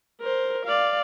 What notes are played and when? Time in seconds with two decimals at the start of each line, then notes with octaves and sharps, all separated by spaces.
0.21 A#4 C5
0.66 D5 F5